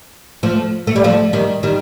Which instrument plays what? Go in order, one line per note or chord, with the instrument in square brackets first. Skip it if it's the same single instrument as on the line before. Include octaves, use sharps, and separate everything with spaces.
[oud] F3 A3
A3
G3
F3 A3
D#3 G3
D#3 G3